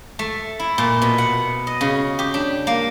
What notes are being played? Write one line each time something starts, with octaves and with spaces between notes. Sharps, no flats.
A3
E4
A#2
B2
F#5
D#5
C#3
G4
D4
A#3